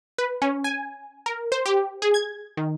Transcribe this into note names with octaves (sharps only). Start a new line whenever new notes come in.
B4
C#4
G#5
A#4
C5
G4
G#4
G#6
D#3